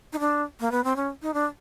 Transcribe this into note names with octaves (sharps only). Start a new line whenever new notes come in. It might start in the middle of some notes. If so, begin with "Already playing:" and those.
D#4
D4
A#3
B3
C4
C#4
D#4
D4